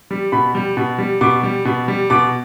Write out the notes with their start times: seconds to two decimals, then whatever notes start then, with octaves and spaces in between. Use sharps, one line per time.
0.11 G3
0.32 B2 B5
0.55 G3
0.77 B2
0.98 G3
1.21 B2 D6
1.43 G3
1.65 B2
1.88 G3
2.10 B2 D6